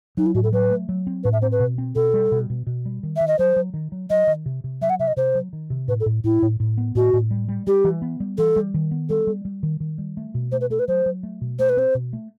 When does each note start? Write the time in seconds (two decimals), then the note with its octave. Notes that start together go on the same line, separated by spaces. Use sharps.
0.17 F#3 D#4
0.26 E4
0.34 A2 F#4
0.43 A4
0.53 F#3 B4
0.71 A3
0.89 F#3
1.07 C4
1.24 A2 B4
1.33 E5
1.42 C4 C5
1.52 B4
1.60 B2
1.78 C4
1.95 B2 A4
2.14 G3
2.32 B2
2.50 B2
2.67 B2
2.85 G3
3.03 D#3
3.16 D#3 E5
3.27 D#5
3.39 F#3 C5
3.56 F#3
3.74 D#3
3.92 F#3
4.10 F#3 D#5
4.27 D#3
4.46 C3
4.64 C3
4.81 F#3 E5
4.90 F#5
4.99 C3 E5
5.07 D#5
5.16 C3 C5
5.35 F#3
5.53 D#3
5.70 C3
5.88 A2 B4
6.00 A4
6.06 A2
6.24 A2 E4
6.42 A2
6.60 A2
6.78 B3
6.95 A2 F#4
7.13 A2
7.31 G3
7.48 G3
7.67 G3 G4
7.84 E3
8.02 B3
8.20 G3
8.38 E3 A4
8.56 G3
8.74 D#3
8.91 B3
9.09 G3 A4
9.27 G3
9.45 G3
9.63 D#3
9.80 D#3
9.98 G3
10.17 A3
10.34 B2
10.52 A3 C5
10.61 B4
10.70 A3 A4
10.79 B4
10.88 F#3 C5
11.06 F#3
11.23 A3
11.41 B2
11.59 A3 C5
11.69 B4
11.77 C4 C5
11.95 B2
12.13 A3